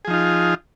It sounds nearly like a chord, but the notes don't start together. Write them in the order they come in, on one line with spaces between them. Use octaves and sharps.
G#4 F3 D#4 F4